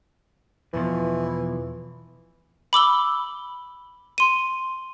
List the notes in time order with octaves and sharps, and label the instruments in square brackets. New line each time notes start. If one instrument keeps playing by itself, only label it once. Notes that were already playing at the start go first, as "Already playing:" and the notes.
[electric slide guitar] E2 B2 F3 [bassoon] E3
[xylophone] B5 D6 E6 G7
C6 D#7